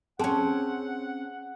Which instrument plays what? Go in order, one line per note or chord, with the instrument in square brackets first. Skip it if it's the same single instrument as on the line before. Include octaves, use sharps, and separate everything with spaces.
[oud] C4 C#4 [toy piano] G#4 A5 [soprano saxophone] F#5